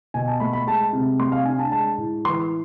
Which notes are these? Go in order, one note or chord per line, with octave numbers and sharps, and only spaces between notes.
B2 G#5
A5
A3 B5
B5
G#3 A5
C3
A3 C6
F5
D4 G#5
A5
G#3 A5
A2
E3 C6